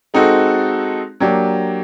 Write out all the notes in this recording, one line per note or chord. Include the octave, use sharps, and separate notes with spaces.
G#3 C4 D#4 F#4 A4
F#3 A#3 D4 G4